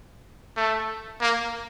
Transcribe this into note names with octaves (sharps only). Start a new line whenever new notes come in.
A3
A#3